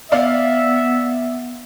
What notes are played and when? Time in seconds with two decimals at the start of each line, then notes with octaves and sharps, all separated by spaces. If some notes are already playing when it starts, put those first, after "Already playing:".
0.12 B3 D5 E5 F5